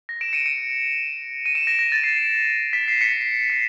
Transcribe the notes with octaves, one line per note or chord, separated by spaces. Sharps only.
A#6
D7 E7
C#7 D#7
C#7 D#7
D#7
D7 E7
A#6
A#6
A6
C7 D7
B6
C7
B6 C#7
C7